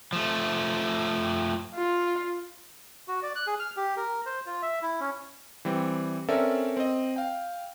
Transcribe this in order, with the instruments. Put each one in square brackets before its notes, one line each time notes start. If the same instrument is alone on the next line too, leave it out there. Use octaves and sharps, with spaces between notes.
[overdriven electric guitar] F3 A3
[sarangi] F4
[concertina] F#4
D5
F#6
G#4
F6
G4
A#4
C5
F4
E5
E4
C#4
[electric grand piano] E3 G3 C4
C4 C#4 A4 A#4 D5 E5
C4 D#5
F5 G5